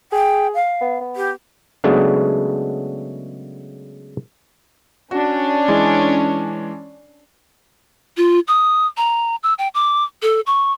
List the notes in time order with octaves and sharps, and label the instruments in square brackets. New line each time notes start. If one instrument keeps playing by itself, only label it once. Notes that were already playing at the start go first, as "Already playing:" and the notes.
[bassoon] G#4 [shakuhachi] G5
[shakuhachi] F5
[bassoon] B3
B3
[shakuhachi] G4
[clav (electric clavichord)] C#3 F#3 G#3 A3 B3 D4
[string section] C#4 D4 [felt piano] F#4
[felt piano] E3 G#3
[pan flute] F4
D#6
A#5
E6
G5
D6
A4
C#6